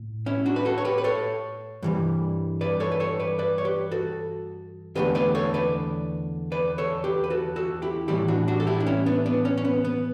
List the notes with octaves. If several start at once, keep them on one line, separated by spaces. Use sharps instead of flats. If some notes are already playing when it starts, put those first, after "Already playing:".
Already playing: A2
C#4 E4
D4 F#4
B4
F#4 A4
C#5
G4 B4
B4
A4 C#5
G2 E3 G3
B4 D5
A4 C#5
B4
A4 C#5
B4 D5
B4 D5
C#5
G4 B4
F#4 A4
E2 D3 F#3 A3 G4 B4
B4 D5
A4 C#5
B4 D5
B4 D5
A4 C#5
G4 B4
B4
F#4 A4
F#4 A4
E4 G4
A2 E3 G3 E4 G4
D4 F#4
D4 F#4
A4
E4 G4
D4
C#4 E4
B3 D4
B3 D4
C#4
C#4
B3
B3